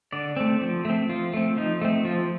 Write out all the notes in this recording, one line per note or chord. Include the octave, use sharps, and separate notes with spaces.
D3 D5
A3 C4
F3
A3 C4
F3 F4
A3 C4
F3 D#4
A3 C4
F3 F4